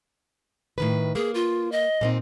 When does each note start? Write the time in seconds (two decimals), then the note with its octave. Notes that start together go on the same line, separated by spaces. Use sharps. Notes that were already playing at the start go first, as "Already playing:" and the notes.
0.78 A2 D#3 B4
1.15 A#3 G#4
1.35 F4
1.72 D#5
2.01 A#2 C4 D#4